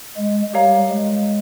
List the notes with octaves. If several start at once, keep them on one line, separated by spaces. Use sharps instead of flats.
G#3
G3 G4 A#4 C#5 F5 A#5
G#3